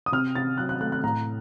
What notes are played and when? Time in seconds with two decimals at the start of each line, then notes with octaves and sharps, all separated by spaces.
0.06 D#6
0.12 C3 F6
0.35 C3 A6
0.58 F#3 F#6
0.69 F#6
0.81 A3 F#6
0.92 F#6
1.04 A2 A#5